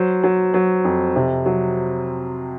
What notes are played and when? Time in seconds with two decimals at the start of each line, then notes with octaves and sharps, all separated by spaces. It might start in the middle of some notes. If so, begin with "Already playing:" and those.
Already playing: F#3 C5
0.23 F#3
0.54 F#3
0.84 F2
1.16 C3
1.46 F#3